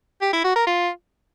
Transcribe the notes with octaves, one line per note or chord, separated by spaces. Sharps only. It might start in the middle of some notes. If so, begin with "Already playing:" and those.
G4
E4
F#4
A#4
F4